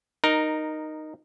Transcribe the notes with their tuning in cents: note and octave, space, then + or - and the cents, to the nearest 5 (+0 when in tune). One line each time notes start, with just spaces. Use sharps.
D#4 -10 A#4 +5